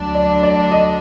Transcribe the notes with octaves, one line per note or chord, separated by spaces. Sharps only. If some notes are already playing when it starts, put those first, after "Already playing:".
Already playing: D2 D3 F#3 D4
D5
D5
D#5